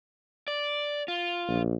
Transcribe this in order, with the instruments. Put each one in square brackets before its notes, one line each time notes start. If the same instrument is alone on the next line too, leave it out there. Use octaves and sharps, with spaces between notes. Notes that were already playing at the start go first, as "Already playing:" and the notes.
[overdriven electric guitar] D5
F4
[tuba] A#1